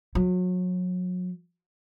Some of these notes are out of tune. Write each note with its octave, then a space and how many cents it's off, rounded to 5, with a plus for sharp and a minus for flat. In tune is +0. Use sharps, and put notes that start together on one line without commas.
F#3 -30